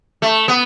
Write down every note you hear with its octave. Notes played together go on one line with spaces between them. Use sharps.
A3
B3